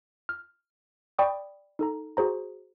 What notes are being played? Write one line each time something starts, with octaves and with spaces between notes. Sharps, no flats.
F6
D5 G5 B5 C#6 D#6
D#4 A4 A#5
F#4 G#4 C5 A#5